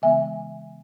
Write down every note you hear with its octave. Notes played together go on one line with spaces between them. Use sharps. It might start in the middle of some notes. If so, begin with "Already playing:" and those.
C#3 E3 G#3 B3 E5 G#5